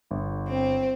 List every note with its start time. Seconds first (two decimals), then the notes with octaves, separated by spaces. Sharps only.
0.11 G1
0.48 C4